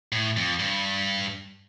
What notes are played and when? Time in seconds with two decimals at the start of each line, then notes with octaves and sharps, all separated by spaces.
0.12 A2
0.37 F2
0.59 G2